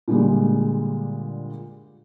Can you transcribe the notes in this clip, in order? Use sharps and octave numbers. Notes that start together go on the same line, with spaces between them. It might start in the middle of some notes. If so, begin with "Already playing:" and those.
A#2 D3 G3 G#3